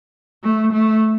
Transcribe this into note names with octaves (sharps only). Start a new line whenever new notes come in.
A3
A3